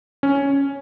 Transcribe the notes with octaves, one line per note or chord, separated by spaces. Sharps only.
C#4